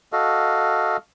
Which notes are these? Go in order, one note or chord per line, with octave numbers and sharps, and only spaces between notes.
F#4 A4 D#5 F5